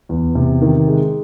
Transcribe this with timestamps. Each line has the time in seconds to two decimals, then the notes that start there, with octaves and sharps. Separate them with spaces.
0.09 E2
0.35 C3
0.61 D#3
0.88 G#3